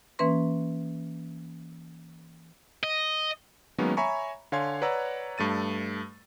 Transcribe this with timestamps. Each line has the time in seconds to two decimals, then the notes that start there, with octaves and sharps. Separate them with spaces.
0.19 E3 A#3 C#4 B4 C6
2.83 D#5
3.78 D#3 F#3 G#3 A#3 B3 C#4
3.97 C#5 E5 G#5 A#5 B5 C#6
4.52 D3 C#5 F5 G#5 C6 G#6
4.82 B4 C#5 D5 F#5 A#5 E6
5.38 G2 A3 A6 D#7